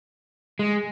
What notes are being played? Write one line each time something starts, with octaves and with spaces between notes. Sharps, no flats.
G#3